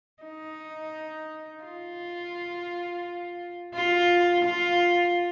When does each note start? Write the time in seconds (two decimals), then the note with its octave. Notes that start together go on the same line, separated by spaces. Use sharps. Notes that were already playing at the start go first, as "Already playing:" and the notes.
0.23 D#4
1.64 F4
3.74 F4
4.45 F4